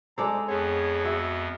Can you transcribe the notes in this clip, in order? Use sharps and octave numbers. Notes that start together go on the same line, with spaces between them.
G#3 D4 A4 C5 A#5
F2 B3 G#4 C#5
F#4 E5